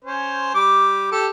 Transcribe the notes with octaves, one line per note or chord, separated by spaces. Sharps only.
C#4 C5
G3 D6
G4 A4